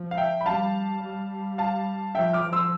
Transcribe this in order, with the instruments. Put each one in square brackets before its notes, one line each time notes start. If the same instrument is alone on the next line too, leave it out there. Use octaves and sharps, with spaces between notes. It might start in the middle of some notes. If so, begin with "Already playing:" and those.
Already playing: [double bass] F3
[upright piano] F5
E5 G5
B5
[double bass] G3 [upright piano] F5 A5
[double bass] G3
[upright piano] F5 A5
[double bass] F3 [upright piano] E5 G5
[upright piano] D6 F6
[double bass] F3
[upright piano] C6 E6